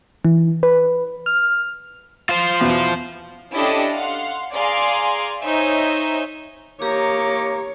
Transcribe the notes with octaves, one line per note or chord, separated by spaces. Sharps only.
E3
B4
F6
F4 C5
E2 B2
C#4 D4 E4 G4 A4 D#5
F5 F#5 C6
G#4 D5 F5 G#5 A#5 C6
D#4 C5 C#5 E5 G#5
A#3 G4 C#5 D#5 A#5 C#6 D6